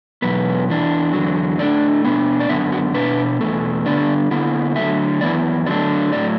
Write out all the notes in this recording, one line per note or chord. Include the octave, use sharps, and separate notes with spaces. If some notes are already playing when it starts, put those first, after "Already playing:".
E2 B2 F#3 B3 B4
E2 E3 D4
E2 D3 F#3
A2 A3 D4 D5
B2 B3 D4
D5
F#2 D3 B3 E5
F#4
B2 B3 D4 B4
E2 B2 A3
D3 B3 D4 D5
D3 B3 E4
D3 F#3 A3 E5
F#2 E3 B3 E4 D5
D3 F#3 A3 D4 D5
A2 F#3 A3 D5